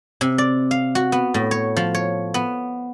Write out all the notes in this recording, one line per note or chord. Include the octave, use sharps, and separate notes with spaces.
C3
D5
F5
F#4
B3
A2
C#5
F3
C#5
B3